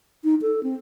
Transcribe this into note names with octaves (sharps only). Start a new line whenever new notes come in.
D#4
A4
C4